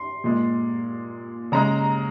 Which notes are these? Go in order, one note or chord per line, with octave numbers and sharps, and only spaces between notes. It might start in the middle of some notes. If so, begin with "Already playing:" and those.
Already playing: C6
A#2 G#3
C#3 G#3 A#5